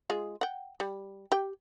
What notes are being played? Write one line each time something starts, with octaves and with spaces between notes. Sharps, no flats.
G#3 F4 G#4
F#5 G5
G3
G4 G5